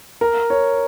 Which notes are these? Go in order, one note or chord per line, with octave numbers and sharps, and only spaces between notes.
A#4
C#5